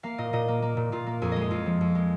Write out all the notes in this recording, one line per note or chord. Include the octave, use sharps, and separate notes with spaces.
A#3 F5
A#2 D#5
A#2 D#5
A#3
A#3
A#2
A#2 F4
A#3
F2 G#4
G#3 D#5
G#4
F2 F4
F3
F2
G#3